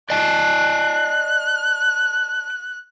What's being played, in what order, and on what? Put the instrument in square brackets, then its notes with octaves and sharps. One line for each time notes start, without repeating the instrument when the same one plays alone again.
[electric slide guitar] D5 D#5 A5 [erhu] F#6